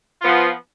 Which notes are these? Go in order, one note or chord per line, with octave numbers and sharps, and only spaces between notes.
F3 B3 F4